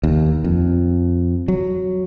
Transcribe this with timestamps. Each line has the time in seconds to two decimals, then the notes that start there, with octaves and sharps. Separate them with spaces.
0.03 D#2
0.44 F2
1.48 F#3